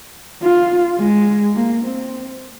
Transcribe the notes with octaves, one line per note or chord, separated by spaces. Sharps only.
F4
G#3
A#3
C4